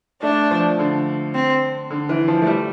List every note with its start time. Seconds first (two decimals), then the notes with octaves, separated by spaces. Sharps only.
0.23 A3 D4
0.51 F3
0.79 D3
1.35 C4
1.90 D3
2.09 E3
2.28 F3
2.42 A3
2.47 G3